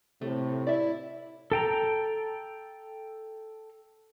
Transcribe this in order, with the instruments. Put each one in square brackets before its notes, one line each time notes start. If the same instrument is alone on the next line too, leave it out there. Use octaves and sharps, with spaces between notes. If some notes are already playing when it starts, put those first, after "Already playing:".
[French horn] A2 [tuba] C3 [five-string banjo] A3
[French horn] E4 [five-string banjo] D5 E5
[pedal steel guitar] A4 G5 A#5